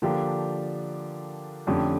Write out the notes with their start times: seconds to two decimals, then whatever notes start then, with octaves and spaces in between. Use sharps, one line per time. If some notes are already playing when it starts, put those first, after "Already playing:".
0.02 D3 F3 A#3 D4 G4
1.67 F2 D3 A3 C#4 G4